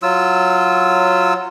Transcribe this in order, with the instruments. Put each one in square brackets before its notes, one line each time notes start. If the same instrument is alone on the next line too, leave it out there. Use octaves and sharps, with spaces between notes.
[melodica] F#3 F4 E6